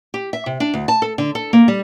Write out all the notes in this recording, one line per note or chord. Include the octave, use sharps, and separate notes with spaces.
G4
E5
C3
D4
D2
A5
A4
D3
A4
A#3
G3